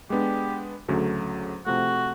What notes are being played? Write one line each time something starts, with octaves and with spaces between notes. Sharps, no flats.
G#3 B3 D4 G4
D2 C#3 F#3 A3 C#4
C3 F3 A3 F#4